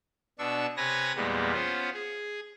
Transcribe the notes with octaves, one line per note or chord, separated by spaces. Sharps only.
B2 D4 C#6 E6
C3 B4 C#5 G#5 A#6
E2 A#2 G3 G#3 B3
B3 C#4 F4 C5
G#4